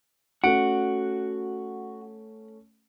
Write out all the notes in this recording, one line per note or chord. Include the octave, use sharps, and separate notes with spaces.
A3 C#4 F#4 F#5 D7